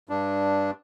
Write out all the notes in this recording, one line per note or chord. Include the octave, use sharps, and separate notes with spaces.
G2 D4